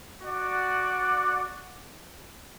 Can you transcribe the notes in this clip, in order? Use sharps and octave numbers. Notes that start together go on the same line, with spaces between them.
F#4 D5 F#5